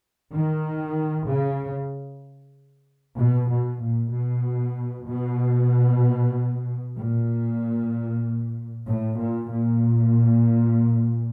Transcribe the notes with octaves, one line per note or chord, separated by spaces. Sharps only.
D#3
C#3
B2
B2
A#2
B2
B2
A#2
A2
A#2
A#2